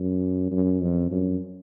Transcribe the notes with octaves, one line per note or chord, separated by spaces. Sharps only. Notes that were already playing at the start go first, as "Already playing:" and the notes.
Already playing: F#2
F#2
F2
F#2